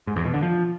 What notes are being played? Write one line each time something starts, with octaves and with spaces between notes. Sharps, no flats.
G#2
E2
B2
D3
F3